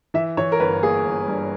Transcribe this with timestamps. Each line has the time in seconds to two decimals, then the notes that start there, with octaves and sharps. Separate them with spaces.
0.14 E3 E5
0.37 E3 C#5
0.52 A#4
0.60 G1 B4
0.82 A#3 G#4
1.05 G1
1.28 G2